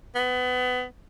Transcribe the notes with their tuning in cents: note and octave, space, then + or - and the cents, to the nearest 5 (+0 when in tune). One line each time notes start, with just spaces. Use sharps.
B3 +25